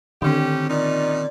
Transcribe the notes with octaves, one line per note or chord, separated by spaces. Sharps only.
A2 D3 D#3 C4 C#4 G4
A#2 C#4 D#4 D5